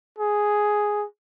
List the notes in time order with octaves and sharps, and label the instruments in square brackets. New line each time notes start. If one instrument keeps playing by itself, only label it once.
[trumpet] G#4